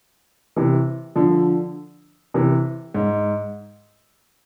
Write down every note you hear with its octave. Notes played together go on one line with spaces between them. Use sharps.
C3 E3
D3 F3
C3 E3
G#2